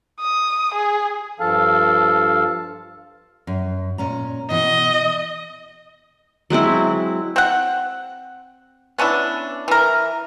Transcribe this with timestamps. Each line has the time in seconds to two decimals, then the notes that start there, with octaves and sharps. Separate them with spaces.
0.20 D#6
0.74 G#4
1.40 G2 F3 A4 F5 A5
3.47 F#2
3.98 A#2 C#4 A#5
4.50 B2 E3 D#5
6.50 F#3 G#3 C4 E4
7.36 C4 F#5
8.98 B3 C#4 D4 E4
9.68 E3 A#4